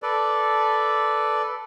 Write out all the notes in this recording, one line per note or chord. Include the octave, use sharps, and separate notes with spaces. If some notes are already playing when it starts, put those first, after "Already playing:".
A4 B4 D5